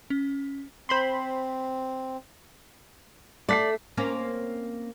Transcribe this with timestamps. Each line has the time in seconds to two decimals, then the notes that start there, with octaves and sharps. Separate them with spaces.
0.10 C#4
0.89 C4 C5 B5 C6
3.49 A3 D5 A5 B6 C7
3.97 A#3 C4 C#4